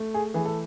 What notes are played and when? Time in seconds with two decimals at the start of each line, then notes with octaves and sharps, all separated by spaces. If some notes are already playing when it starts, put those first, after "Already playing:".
Already playing: A3
0.14 G#4
0.34 E3 G#4
0.46 A4